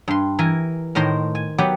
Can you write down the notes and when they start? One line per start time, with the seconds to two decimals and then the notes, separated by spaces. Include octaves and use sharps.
0.08 G2 C6
0.39 E3 A#4 G#5
0.95 A2 D#3 C5 A#5 C6
1.35 G#5
1.58 F#3 B3 G4 F#5